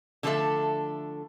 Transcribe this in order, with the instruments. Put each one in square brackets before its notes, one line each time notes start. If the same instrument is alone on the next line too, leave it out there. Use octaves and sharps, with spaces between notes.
[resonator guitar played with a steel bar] D3 F3 A3 D4 A4 E5